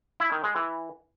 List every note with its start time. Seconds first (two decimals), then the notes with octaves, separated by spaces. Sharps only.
0.20 E4
0.32 D#3
0.44 G#3
0.56 E3